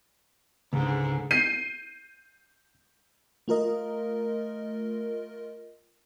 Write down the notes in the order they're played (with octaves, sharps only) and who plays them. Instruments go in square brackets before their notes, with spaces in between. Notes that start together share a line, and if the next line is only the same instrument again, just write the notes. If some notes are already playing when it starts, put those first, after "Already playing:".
[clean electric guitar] C#2 [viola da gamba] G#2 D3
[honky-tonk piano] G6 C7 D#7
[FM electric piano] A3 F4 A#4 D#5